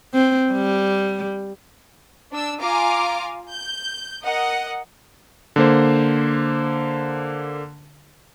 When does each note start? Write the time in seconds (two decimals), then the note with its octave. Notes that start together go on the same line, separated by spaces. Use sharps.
0.14 C4
0.52 G3
2.32 D4 E6
2.60 F4 F5 G#5 A#5 D6
3.51 G6
4.21 A#4 D#5 F#5
5.56 D3 A#3 C5